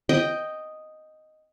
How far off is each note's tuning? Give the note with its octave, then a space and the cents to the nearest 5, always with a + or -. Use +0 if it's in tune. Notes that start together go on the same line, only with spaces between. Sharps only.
D#5 +0 G5 +0